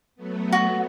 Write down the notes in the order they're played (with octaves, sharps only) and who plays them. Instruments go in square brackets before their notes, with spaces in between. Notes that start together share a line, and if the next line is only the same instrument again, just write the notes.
[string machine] F#3 A3 B3
[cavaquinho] F#4